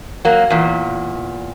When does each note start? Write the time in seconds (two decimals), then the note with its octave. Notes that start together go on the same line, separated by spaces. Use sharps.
0.25 F#3 A#3
0.50 E2 A#2